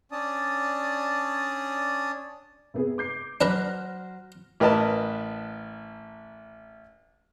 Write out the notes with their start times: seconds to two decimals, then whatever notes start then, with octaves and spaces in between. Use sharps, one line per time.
0.12 C#4 D4 D5 A5 D#6
2.74 C3 B3 G#4
2.98 D6 G6 C7
3.41 F#3 D4 B4 C5 A#5 F6 F#6 A#6
4.60 A1 A#4 B4 D#5 A5